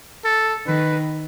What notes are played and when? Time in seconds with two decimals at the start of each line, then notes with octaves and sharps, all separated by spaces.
0.24 A4
0.67 D#3 B4